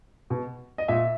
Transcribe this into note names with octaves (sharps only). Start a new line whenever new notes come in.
B2
D#5
A#2 E5